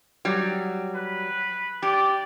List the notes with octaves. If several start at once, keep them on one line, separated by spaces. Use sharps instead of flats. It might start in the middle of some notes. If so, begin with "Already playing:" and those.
F#3 G3
B4
G4 D5